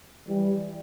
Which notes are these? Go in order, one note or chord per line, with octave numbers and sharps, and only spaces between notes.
E3 G3